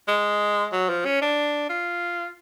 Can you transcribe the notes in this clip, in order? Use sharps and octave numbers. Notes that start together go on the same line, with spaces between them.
G#3
F#3
F3
C#4
D4
F4